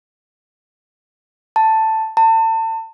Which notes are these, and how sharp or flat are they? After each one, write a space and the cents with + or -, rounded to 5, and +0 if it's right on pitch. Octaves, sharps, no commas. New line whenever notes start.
A5 +5
A5 +35